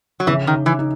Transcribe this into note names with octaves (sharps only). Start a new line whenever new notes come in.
F#3
C#3 E3
D#3
D#4
E3
D#4